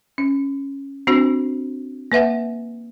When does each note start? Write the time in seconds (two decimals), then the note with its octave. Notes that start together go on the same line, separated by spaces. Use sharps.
0.18 C#4
1.07 C4 D4 F#4 C5
2.12 A#3 B4 E5 F#5